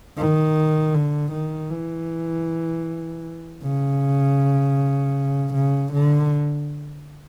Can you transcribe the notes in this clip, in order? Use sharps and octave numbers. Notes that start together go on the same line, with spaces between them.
D#3
D3
D#3
E3
C#3
C#3
D3